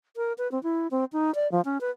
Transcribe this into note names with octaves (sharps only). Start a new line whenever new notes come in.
A#4
B4
C4
E4
C4
D#4
D5
F3
C#4
B4